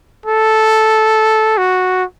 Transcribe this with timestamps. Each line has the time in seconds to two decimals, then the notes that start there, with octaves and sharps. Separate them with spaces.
0.26 A4
1.58 F#4